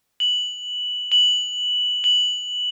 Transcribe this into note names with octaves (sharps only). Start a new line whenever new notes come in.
F#7
F#7
F#7